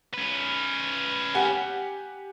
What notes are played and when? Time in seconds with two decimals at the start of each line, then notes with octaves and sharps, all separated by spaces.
0.14 C#4 B4
1.35 G4 F#5 G#5